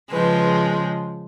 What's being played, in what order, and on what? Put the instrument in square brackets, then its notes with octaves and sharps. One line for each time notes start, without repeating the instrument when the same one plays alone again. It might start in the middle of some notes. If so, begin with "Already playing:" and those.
[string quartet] C#3 F3 G#3 B4